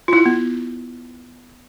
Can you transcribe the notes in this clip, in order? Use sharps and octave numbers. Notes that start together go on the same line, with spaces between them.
F4
E4
B3